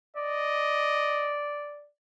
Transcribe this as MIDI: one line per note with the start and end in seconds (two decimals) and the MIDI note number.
0.16 1.86 74
0.16 1.38 75